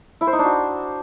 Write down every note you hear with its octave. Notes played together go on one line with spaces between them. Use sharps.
E4
C5
D#4
D4
F#4